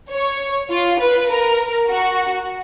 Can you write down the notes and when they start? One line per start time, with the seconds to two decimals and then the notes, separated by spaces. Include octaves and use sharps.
0.10 C#5
0.70 F4
1.00 B4
1.29 A#4
1.89 F#4